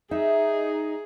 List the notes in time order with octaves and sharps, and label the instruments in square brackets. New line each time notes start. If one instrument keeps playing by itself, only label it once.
[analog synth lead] D#4 [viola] G#4 [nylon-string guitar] E5